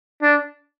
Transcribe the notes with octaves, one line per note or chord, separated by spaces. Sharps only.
D4